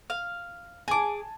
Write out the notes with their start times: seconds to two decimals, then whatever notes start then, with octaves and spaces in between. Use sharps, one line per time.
0.10 F5
0.88 G#4 G#5 A5 D6